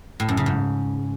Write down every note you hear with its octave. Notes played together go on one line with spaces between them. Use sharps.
A2
F#2
C#3
G#2